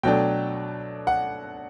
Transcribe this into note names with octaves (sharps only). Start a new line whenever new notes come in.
B2 F#3 A3 D4 G5
F#5